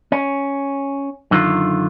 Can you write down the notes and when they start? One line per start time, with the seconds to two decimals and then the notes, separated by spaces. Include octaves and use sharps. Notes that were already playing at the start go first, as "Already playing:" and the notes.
0.12 C#4
1.31 F#2 D3 D#3 F4